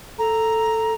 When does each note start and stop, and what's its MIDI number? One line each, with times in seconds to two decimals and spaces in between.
0.18 0.94 69
0.18 0.95 82